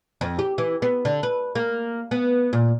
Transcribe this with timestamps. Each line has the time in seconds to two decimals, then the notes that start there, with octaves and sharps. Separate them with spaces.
0.21 F2
0.39 G4
0.58 E3
0.82 B3
1.05 D3
1.23 B4
1.55 A#3
2.11 B3
2.53 A#2